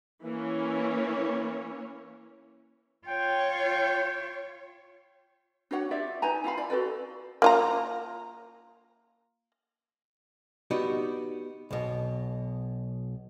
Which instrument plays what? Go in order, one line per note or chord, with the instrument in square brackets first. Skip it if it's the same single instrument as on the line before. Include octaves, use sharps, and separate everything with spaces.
[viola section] E3 A#3 C#4 C#5
[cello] F4 C#5 [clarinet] G5
[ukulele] D4 F#4 C#5 F#5
F4 G4 D5 E5
D#4 B4 G#5 A#5
E4 F4 F5 B5
D5 G#5
F#4 A4 B4 D5
[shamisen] A#3 F4 A#5
[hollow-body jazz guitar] B3 D#4 F#4 G4 D5
B1 B2